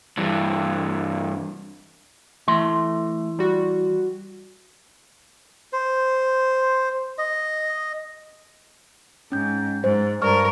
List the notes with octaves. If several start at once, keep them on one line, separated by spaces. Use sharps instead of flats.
G2 E3
E3 A3 C6
G3 F#4
C5
D#5
G#2 C#4 G6
G#2 C5
G2 A#4 D5 C#6 F6